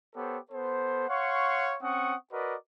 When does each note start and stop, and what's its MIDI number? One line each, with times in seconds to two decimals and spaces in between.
0.15 0.38 59
0.15 0.38 67
0.15 0.38 69
0.15 0.38 72
0.15 0.38 73
0.51 1.06 59
0.51 1.06 69
0.51 1.06 72
1.08 1.76 73
1.08 1.76 77
1.08 1.76 78
1.08 1.76 84
1.08 1.76 85
1.82 2.15 60
1.82 2.15 61
1.82 2.15 78
1.82 2.15 85
1.82 2.15 87
2.32 2.54 66
2.32 2.54 70
2.32 2.54 71
2.32 2.54 74
2.32 2.54 75